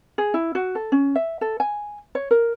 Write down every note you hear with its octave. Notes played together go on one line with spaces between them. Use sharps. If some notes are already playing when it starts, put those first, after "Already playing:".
G#4
E4
F#4
A4
C#4
E5
A4
G#5
C#5
A#4